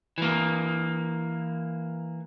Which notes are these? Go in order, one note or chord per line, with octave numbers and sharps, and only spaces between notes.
E3 A#3